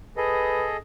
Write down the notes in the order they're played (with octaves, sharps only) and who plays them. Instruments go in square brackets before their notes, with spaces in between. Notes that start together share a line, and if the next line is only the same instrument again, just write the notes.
[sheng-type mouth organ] G#4 A4 D#5 [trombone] B4